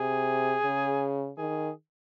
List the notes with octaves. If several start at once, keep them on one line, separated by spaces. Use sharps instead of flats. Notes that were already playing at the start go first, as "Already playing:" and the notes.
Already playing: C3 G#4
C#3
D#3 G#4